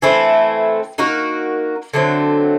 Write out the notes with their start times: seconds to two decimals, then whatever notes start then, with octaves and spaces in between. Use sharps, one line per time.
0.02 E3 A3 C4 E4
0.98 A#3 D#4 F#4 A#4
1.93 D3 F#3 A3 C4